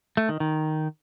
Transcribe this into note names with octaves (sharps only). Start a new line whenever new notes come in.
A3
D#3
D#3